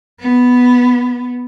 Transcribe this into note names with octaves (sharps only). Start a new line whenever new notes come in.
B3